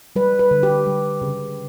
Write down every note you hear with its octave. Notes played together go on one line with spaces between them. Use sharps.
G3 B4
B4
D3
G4
G3
C#3